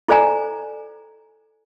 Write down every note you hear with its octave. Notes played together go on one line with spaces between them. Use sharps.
E4 A4 C5 D5 G#5 A#5